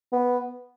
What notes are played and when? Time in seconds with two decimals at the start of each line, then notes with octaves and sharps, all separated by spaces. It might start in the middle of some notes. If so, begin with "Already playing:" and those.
0.13 B3